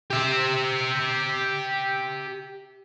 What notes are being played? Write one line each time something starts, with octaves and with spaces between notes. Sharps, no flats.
G4 E5